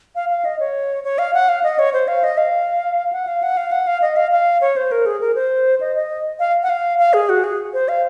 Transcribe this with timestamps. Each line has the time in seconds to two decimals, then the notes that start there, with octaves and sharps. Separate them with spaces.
0.15 F5
0.29 F5
0.45 D#5
0.60 C#5
1.04 C#5
1.18 F5
1.34 F#5
1.49 F5
1.63 D#5
1.79 C#5
1.93 C5
2.08 F5
2.24 D#5
2.37 F5
3.13 F#5
3.27 F5
3.43 F#5
3.57 F5
3.72 F#5
3.87 F5
4.02 D#5
4.16 F5
4.31 F5
4.61 C#5
4.76 C5
4.92 A#4
5.06 G#4
5.21 A#4
5.35 C5
5.81 D#5
5.96 D#5
6.39 F5
6.63 F#5
6.69 F5
6.99 F5
7.14 G#4
7.29 F#4
7.44 G#4
7.74 C5
7.88 F5